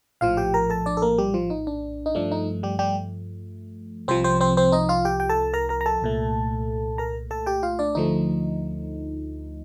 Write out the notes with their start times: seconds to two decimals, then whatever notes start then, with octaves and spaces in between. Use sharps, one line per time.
0.21 A#1 A2 F3 F4 F5
0.37 G4 G5
0.54 A#4 A#5
0.70 A4 A5
0.86 D4 D5
0.97 A4
1.02 A#3 A#4
1.18 G3 G4
1.34 F3 F4
1.50 D#4
1.67 D4
2.06 D#4
2.15 G2 F3 A3 D4
2.32 D#4
2.63 G3 G4
2.79 G3 G4
4.08 C2 C3 F3 C4 C5
4.24 C4 C5
4.41 C4 C5
4.57 C4 C5
4.72 D#4 D#5
4.89 F4 F5
5.05 G4 G5
5.20 G5
5.29 A4 A5
5.53 A#4 A#5
5.69 A#4 A#5
5.81 A#5
5.86 A4 A5
6.01 C2 A#2 A3
6.98 A#4 A#5
7.31 A4 A5
7.46 G4 G5
7.63 F4 F5
7.79 D4 D5
7.95 D2 D3 F3 A3 D#4